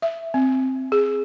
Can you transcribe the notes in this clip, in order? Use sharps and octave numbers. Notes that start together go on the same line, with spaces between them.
E5
C4
G#4